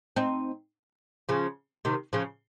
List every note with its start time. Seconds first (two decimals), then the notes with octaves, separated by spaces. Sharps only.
0.16 C4 D#4
1.29 C#3 F3
1.85 C3 D#3
2.13 C#3 F3